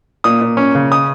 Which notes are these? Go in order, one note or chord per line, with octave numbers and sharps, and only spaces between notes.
A#2 D#6
A#2
C#4
C#3
D#6